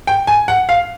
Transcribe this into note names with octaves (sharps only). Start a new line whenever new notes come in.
G5
G#5
F#5
F5